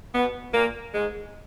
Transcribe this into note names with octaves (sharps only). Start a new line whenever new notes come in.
B2 B3
A#2 A#3
G#2 G#3